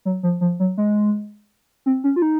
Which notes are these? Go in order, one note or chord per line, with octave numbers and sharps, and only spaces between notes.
F#3
F3
F3
F#3
G#3
C4
C#4
F4
D#4